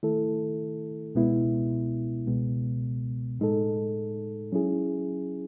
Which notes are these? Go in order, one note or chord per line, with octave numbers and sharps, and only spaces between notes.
D#3 A3 E4 A4
C#2 B2 G#3 B3 E4
C#2 B2 G#3 B3
A2 G#3 D#4 A4
F#3 C#4 E4 G#4